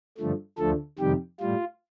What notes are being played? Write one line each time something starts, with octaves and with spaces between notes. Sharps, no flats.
G2 D3 F3 A3
D2 D3 F3 A3 A4
F2 C3 D#3 G3 G4
A2 G3 F4